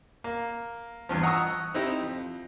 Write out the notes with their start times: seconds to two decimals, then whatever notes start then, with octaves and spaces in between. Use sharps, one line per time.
0.24 A#3
1.09 E2 G2 F3
1.22 D#5 F#5 A#5 C#6 D#6 E6
1.74 C4 D#4 E4 G4
2.02 F2